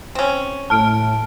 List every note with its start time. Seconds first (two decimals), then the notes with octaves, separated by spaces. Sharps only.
0.15 C4 C#4
0.70 A2 A5 F6 D7